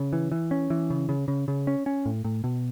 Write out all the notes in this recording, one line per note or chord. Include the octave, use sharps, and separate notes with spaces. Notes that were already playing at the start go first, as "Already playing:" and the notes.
Already playing: C#3
E3
E3
C#4
E3
C#3
C#3
C#3
C#3
C#4
C#4
A2
A2
B2